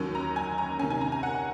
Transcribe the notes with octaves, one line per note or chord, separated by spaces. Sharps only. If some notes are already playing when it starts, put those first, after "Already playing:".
Already playing: D#2 D#3 F#3 C#4
A#5
G#5
A#5
C3 D#3 A#3 C#4 G#5
G#5
A#5
G#5
F#5